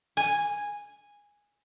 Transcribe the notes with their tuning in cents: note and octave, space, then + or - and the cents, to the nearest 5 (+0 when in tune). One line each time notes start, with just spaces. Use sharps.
G#5 -10